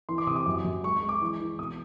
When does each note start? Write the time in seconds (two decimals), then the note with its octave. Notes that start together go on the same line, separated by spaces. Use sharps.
0.09 E3 C6
0.18 D6
0.27 C3 D#6
0.36 D6
0.46 F#2
0.65 F#2
0.83 G#3 C#6
0.97 C#6
1.02 G#3
1.09 D6
1.21 E3
1.40 E3
1.59 B2 D#6